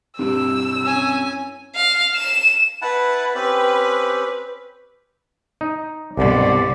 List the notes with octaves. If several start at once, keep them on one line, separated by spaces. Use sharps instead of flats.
G2 C4 E4 A#4 E6
C#4 G#5
F5
E7
E4 B4 F#5 A5
C4 C#4 G4 B4
D#4
C2 G2 B2 D3 D5